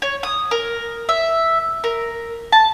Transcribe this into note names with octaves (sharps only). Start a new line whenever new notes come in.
C#5
D#6
A#4
E5
A#4
A5